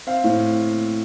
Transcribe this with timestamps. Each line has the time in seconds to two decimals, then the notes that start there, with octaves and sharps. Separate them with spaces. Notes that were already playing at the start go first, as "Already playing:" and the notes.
0.07 C4 F5
0.24 A2